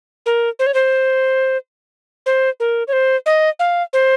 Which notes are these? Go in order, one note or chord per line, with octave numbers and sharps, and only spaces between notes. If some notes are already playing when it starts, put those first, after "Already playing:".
A#4
C5
C#5
C5
C5
A#4
C#5
C5
D#5
F5
C5